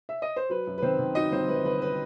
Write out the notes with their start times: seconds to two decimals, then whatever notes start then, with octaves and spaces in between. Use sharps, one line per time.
0.09 E5
0.22 D#5
0.36 C5
0.49 F#3 B4
0.67 F#2
0.78 B4
0.82 D#3 C4 C5
0.99 D#3
1.15 F#3 D#4 D#5
1.32 G1 C4 C5
1.48 G1 B4
1.64 G1 B4
1.82 B4